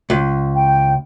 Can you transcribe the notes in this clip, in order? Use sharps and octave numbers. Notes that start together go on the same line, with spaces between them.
C#2
G5